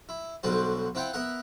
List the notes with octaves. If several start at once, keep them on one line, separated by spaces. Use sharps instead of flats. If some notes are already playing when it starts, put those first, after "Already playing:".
E4
B1 D3 G3 F#4 C5
C4 E4 F4 F#5 G5
B3 A#4 E5 F#5